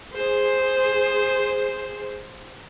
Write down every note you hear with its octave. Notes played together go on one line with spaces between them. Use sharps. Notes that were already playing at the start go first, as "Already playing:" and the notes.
G#4 C5